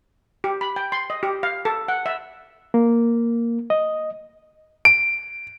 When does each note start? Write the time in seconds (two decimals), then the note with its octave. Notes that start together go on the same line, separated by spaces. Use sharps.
0.44 G4
0.61 B5
0.76 G5
0.92 C6
1.10 D#5
1.23 G4
1.43 F5
1.65 A4
1.88 F#5
2.06 E5
2.74 A#3
3.70 D#5
4.85 D7